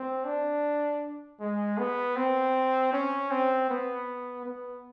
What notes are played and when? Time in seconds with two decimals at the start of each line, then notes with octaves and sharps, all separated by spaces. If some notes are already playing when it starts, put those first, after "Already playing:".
Already playing: C4
0.25 D4
1.40 G#3
1.78 B3
2.16 C4
2.93 C#4
3.31 C4
3.69 B3
4.45 B3